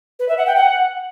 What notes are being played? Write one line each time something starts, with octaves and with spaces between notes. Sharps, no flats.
B4
E5
F#5
G5
F#5